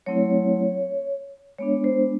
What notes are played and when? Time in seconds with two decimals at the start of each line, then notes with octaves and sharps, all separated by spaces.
0.06 F#3 A3 C4 E4 C#5
1.58 G#3 B3 D4 C#5
1.84 C5